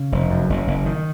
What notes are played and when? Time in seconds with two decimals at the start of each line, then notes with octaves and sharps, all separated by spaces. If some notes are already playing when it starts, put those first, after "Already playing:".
Already playing: C#3
0.12 F1
0.30 F#2
0.49 F#1
0.67 F#1
0.86 D#3